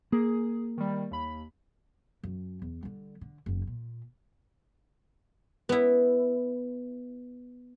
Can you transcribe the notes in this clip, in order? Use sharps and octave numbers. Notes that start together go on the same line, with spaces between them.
A#3 G#4
D#3 G3
D#2 B5
F#2
E2
D3 G3
D3
F#1 E2
A#2
B3 E4